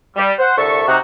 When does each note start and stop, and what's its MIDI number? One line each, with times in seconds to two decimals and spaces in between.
0.16 0.32 55
0.38 0.53 72
0.38 0.53 78
0.57 0.84 36
0.57 0.84 50
0.57 0.84 69
0.57 0.84 76
0.57 0.84 81
0.57 0.84 85
0.88 0.97 48
0.88 0.97 63
0.88 0.97 66